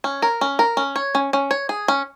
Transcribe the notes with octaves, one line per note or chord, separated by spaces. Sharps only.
C#4
A#4
C#4
A#4
C#4
C#5
C#4
C#4
C#5
G#4
C#4